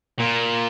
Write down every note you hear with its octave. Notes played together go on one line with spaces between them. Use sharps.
A#2